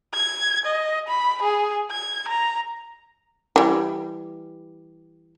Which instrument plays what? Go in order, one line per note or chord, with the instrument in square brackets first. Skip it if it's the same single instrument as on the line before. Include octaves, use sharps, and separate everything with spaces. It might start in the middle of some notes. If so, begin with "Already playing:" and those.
[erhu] G#6
D#5
B5
G#4
G#6
A#5
[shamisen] E3 G3